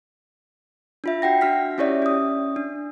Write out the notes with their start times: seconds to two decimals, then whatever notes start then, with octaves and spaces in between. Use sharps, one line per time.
1.04 D4 F4 E5
1.22 F#4 F#5 G5 A#6
1.41 D4 F#4 F6 B6
1.78 C#4 E4 G4 C#5 D5 E5
2.02 C#4 D#6
2.56 D4